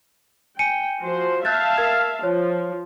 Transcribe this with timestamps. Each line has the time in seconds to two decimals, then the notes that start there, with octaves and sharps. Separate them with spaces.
0.59 G5 G#5 C#7 D#7
1.01 F3 F#4 C5
1.45 E5 F5 A5 F#6 G6 A6
1.77 A#4 F6 G#6
2.23 F3 C#5